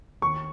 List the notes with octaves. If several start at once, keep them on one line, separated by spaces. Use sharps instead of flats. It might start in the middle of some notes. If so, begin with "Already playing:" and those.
D#2 C#6